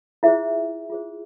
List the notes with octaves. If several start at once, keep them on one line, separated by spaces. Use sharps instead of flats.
E4 F4 G#4 C5 E5
F4 G#4 C5